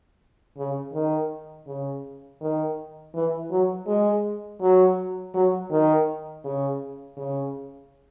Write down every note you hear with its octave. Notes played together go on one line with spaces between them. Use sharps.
C#3
D#3
C#3
D#3
E3
F#3
G#3
F#3
F#3
D#3
C#3
C#3